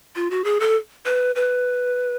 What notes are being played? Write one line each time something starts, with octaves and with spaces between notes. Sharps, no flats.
F4
F#4
G#4
A4
B4
B4